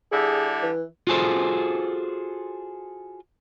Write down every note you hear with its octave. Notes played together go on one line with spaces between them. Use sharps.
D3 G3 E4 G#4
E3
F4 F#4 G#4 A4 C5